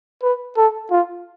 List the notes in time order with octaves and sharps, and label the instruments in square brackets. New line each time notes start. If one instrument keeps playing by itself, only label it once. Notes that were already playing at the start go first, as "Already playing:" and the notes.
[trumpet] B4
A4
F4